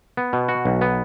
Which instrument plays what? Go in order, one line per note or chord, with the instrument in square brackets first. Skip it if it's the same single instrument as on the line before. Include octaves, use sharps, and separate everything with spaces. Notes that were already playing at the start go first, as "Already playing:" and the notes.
[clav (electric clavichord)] B3
B2
F#4
B1
B3